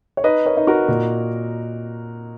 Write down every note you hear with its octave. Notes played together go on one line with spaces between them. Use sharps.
C#5
D#4 B4 D#5
A#4 C#5
D#4
F#4 A#4
A#2